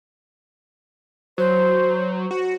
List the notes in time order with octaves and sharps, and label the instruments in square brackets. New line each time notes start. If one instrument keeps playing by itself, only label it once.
[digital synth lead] F#3 [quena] C5
[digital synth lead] F#4